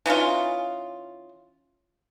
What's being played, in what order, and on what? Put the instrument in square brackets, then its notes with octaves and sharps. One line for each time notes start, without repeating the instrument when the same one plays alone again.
[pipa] E3 C#4 D#4 F4